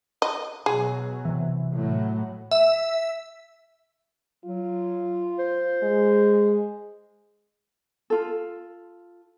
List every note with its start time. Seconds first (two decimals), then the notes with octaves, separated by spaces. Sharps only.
0.22 D#5
0.66 B2 F#3 G#4
1.25 C3 E3
1.72 A2 F#3
2.51 E5
4.45 F#3 F4
5.39 C5
5.83 G#3
8.10 F4 A4